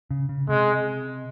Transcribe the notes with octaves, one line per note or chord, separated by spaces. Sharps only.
C#3
C#3
C3 G#3